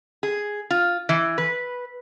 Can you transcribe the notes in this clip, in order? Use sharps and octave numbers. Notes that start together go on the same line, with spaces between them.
G#4
F4
E3
B4